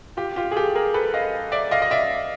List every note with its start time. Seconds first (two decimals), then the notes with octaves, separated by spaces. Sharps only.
0.17 F4 G4
0.36 F4 G4
0.51 G#4
0.56 G4 A4
0.75 G#4 A#4
0.94 A4 B4
1.14 D#5 F5
1.52 D5 E5
1.71 D#5 F5
1.82 D#5
1.91 D5 E5